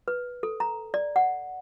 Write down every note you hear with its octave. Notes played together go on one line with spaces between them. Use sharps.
B4
A4
A#5
D5
F#5